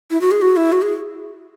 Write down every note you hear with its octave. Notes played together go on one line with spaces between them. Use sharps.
E4
F#4
G#4
F#4
E4
F#4
G#4